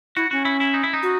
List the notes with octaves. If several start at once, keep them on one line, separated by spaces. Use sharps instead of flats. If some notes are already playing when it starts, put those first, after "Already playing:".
E4 F#4
C#4 F#4
E4
E4
D#4
E4
D#4
F#4